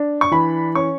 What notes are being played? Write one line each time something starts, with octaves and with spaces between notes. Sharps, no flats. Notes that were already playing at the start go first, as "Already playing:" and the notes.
Already playing: D4
C#6
E3 B5
C#4 C#6